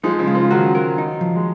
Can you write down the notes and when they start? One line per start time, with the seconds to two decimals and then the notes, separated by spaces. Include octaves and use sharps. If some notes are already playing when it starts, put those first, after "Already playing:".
0.03 F3 G#3 D#4
0.19 C#3 F3
0.27 G#3
0.35 C#3 F3
0.50 D#3 F#3 F#4
0.75 A#4
0.98 D#4
1.21 F3
1.36 G#3